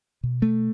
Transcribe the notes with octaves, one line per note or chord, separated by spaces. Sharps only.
B2
A3